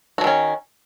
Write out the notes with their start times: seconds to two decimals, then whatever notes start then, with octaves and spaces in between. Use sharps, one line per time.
0.18 F#4
0.21 F3
0.24 D#3
0.27 C#4